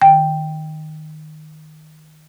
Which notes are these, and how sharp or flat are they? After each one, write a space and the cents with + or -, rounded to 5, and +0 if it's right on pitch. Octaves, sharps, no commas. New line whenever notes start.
D#3 -5 G5 +0